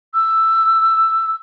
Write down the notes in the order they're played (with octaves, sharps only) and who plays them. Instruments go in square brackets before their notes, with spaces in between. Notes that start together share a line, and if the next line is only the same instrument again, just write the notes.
[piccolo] E6